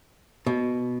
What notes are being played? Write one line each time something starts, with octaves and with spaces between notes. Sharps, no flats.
B2